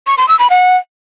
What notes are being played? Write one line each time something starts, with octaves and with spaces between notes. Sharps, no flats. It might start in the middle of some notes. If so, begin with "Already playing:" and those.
C#6
C6
E6
B5
F#5